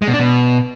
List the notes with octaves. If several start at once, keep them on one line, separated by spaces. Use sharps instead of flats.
G#3
B2
D4
B2